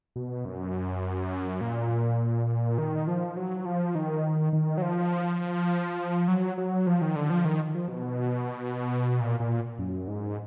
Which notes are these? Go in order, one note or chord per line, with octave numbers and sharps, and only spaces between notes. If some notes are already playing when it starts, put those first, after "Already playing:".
B2
F#2
A#2
D#3
F3
F#3
F3
D#3
D#3
F#3
F3
F#3
F#3
F3
D#3
D3
F3
D#3
F3
B2
A#2
A#2
F#2
G#2